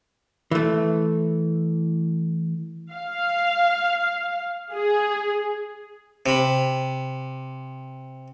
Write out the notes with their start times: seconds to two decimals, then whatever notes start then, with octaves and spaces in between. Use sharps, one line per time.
0.51 E3 A3
2.92 F5
4.73 G#4
6.26 C3 B5